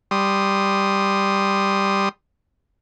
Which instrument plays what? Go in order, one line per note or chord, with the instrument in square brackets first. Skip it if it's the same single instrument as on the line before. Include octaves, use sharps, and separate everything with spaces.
[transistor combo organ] G3 C6 D#6